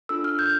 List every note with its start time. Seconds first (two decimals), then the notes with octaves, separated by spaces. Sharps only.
0.09 D4 F4 A4 E6
0.24 F6
0.39 G6